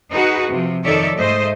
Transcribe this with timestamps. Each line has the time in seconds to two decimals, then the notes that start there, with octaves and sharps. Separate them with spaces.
0.12 D#4 F#4 G#4 B4
0.51 C3 F3
0.84 F2 D#3 A4 C#5 D5 E5
1.16 G#2 A3 C5 D#5